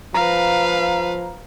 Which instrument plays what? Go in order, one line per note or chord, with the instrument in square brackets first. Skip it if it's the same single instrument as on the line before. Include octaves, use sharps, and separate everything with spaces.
[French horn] F3 [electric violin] B4 F5 [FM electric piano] A#5